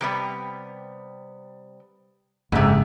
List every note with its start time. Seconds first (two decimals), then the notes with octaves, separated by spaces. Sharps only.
0.01 C3 G3 B3
2.52 F#1 F2 G#2 C3